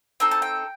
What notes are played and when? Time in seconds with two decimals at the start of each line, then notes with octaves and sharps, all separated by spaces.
0.20 C4 D#4 A4 G5
0.31 A5
0.42 G5